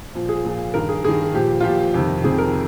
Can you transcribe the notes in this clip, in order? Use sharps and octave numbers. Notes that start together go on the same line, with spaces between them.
A#2 F3
G#4
A#2 F3
G2 D#3 A#4
G#4
G2 D#3 G#4
A#2 F3 G4
F4
A#2 F3 G4
F2 C3 D#3
F2 C3 D#3 G#4
A#4